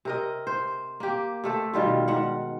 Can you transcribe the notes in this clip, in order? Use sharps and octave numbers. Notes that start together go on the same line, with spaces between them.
C3 A#4 D#5
C5
A#3 G4
C3 A3 A4
B2 D#3 G3 F4
G#2 F#5